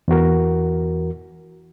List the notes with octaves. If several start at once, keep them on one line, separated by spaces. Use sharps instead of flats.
E2 E3 F#4 A#4